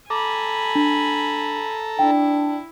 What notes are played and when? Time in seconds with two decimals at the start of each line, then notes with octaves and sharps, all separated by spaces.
0.10 A4 G#5 A#5 B5 D6
0.75 D4
1.99 D4 E4 G5